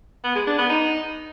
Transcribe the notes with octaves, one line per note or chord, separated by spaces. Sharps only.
B3
G#3
D4
B3
D#4